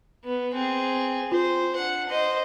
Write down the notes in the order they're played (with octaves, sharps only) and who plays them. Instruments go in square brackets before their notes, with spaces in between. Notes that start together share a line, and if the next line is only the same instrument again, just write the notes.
[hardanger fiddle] B3
C4 G#4
[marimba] F4 [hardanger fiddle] C5
[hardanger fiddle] D4 F#5
C5 D#5